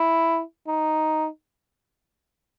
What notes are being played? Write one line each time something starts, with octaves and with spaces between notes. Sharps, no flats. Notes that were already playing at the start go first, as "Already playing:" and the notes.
Already playing: E4
D#4